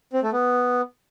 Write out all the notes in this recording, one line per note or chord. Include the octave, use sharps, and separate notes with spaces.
C4
A3
B3